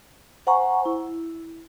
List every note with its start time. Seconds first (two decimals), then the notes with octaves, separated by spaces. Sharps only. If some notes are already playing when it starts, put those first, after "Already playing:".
0.47 C5 F#5 G#5 A#5 C#6
0.86 E4